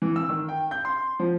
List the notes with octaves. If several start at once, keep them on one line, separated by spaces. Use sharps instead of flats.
E3
E6
D#3
G5
G6
C6
F3